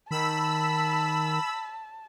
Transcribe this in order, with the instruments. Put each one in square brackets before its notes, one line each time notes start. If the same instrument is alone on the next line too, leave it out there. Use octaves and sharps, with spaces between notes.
[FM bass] D#3 [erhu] A5 [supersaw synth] B5 E6 B6